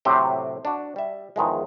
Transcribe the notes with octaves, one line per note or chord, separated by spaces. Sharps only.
A2 C3 F#3 C4 G4 C5
D4 F#4
G3 E5
E2 D#3 F3 G#3